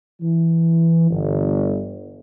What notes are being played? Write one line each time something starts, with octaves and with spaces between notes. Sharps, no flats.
E3
G1